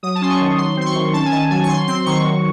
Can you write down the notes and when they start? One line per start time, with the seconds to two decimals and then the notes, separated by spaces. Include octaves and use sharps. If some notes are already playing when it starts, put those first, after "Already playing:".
0.03 F#3 D#6
0.15 A5
0.21 C#4 C6
0.30 C#6
0.40 D#3
0.58 F#3 C6
0.77 C4 C6
0.86 C#6
0.95 D#3
1.13 C#4 A5
1.25 G#5
1.32 D#3 A5
1.51 F#3 G#5
1.63 C#6
1.69 F#3 C6
1.87 C4 C6
2.06 D#3 C#6
2.24 F#3